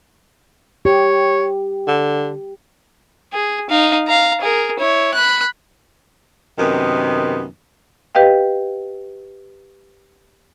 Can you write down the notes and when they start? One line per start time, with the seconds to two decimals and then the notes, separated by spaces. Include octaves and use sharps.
0.85 G4 C#5
1.88 D3
3.33 G#4
3.70 D#4 F5
4.07 F5 A#5
4.41 G#4 A#4
4.79 E4 C#5
5.14 B5 F#6
6.59 F#2 C3 D#3 B3
8.15 G4 B4 D#5 F5 G5